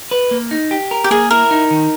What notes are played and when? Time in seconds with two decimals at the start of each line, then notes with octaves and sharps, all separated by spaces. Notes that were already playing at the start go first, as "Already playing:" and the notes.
0.11 B4
0.31 A#3
0.51 D#4
0.71 G4
0.91 A#4
1.04 G4
1.11 A#3 G#4
1.31 E4 A#4
1.51 D#4
1.71 D#3